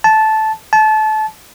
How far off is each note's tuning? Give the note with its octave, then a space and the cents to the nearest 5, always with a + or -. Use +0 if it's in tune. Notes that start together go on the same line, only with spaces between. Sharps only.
A5 -10
A5 -25